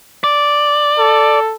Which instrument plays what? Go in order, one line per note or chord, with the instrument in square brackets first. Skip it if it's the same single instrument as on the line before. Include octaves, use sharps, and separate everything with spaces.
[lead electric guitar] D5
[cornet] A4